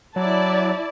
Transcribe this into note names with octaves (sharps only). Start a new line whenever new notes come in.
F#3 E4 D5 A5